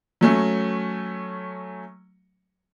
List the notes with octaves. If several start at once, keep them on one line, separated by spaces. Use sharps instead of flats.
F#3 A3 C#4